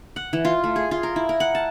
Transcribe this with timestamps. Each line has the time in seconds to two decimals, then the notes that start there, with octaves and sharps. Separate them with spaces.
0.16 F#5
0.33 E3
0.45 F4
0.64 A3
0.76 G#4
0.91 F4
1.03 A#4
1.16 E4
1.29 A#4
1.40 F#5
1.55 A5